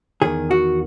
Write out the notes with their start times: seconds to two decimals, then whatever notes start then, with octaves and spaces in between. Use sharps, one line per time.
0.22 E2 D#3 G#4
0.51 F#4